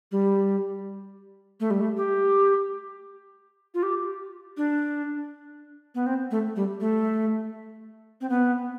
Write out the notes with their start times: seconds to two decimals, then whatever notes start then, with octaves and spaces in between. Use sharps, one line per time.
0.12 G3
1.60 A3
1.71 G3
1.81 A3
1.97 G4
3.74 F4
3.83 G4
4.57 D4
5.95 B3
6.06 C4
6.31 A3
6.56 G3
6.81 A3
8.21 C4
8.29 B3